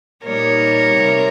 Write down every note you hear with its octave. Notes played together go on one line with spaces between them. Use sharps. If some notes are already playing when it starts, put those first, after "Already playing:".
A#2 G3 A#3 D#4 A#4 C#5
C3 G3 C4